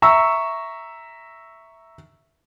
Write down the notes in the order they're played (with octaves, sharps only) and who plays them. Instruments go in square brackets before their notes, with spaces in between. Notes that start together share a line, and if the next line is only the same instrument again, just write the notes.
[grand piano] E5 A#5 C#6 E6